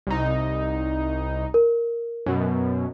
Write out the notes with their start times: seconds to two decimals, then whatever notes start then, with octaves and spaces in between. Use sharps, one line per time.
0.07 C2 D#4
1.54 A#4
2.26 F#2 B2